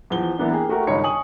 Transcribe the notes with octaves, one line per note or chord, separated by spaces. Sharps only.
E2 F3 G7
E3 A#3 B3 D4
A#3 G4 G#4
A3 F#4 G4 A#4
G1 C#2 D#3 D#4 C#5 C#7
G#5 C#6 D#6 F#7